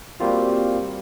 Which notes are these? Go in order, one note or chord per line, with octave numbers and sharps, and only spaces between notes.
G3 A#3 C4 F4 F#4